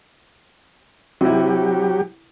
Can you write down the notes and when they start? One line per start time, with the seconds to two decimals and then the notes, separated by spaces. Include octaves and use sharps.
1.21 C3 F#3 E4 G4